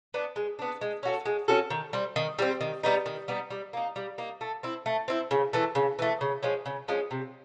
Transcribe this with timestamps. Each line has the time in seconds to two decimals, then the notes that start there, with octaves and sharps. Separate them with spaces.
0.14 B3 D4
0.36 G#3
0.59 B3 D4
0.81 G#3
1.03 C#4 F#4 A4
1.26 G#3
1.48 C#4 F#4 A4
1.70 D#3
1.93 G3 C4
2.16 D#3
2.39 G3 C4
2.61 D#3
2.83 G3 B3 D#4
3.06 D#3
3.28 G3 B3 D#4
3.50 G3
3.73 A#3 D#4
3.96 G3
4.18 A#3 D#4
4.41 A3
4.63 C4 E4
4.86 A3
5.08 C4 E4
5.31 C#3
5.53 E3 A3
5.75 C#3
5.99 E3 A3
6.21 C#3
6.43 F3 G#3 C#4
6.66 C#3
6.88 F3 G#3 C#4
7.11 C3